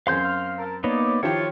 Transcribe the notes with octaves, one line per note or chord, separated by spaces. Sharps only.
C#2 F#2 C4 F5 G#5 C6 G6
F6
A#4 A5
A#3 B3 D#4 C#5 D5
D#3 F3 E4 F4 G4 C#5